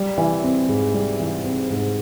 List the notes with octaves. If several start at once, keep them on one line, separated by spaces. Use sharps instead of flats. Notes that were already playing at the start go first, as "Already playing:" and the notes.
Already playing: G3
E3
C4
G#2
G3
E3
C4
G#2